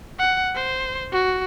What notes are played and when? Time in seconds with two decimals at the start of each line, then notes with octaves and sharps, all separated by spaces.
0.19 F#5
0.55 C5
1.12 F#4